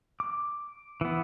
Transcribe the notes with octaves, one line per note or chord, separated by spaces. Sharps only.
D6
E3 B3